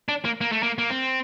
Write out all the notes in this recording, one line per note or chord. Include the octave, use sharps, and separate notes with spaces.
D4
A#3
A#3
A3
A#3
A#3
C4